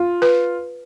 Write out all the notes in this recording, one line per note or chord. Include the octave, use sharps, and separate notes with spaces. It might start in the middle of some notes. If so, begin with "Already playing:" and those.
Already playing: F4
B4